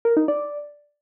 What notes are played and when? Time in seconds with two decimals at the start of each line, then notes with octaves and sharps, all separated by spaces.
0.05 A#4
0.17 D#4
0.28 D5